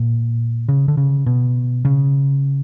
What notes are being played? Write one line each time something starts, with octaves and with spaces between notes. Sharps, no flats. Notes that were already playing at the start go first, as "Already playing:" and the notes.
Already playing: A#2
C#3
D3
C#3
B2
C#3